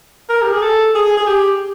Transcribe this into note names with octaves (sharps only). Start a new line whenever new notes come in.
A#4
G4
G#4
A4
G#4
G#4
G4